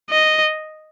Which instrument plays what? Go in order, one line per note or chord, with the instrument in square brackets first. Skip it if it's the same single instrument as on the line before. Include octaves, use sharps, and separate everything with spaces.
[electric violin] D#5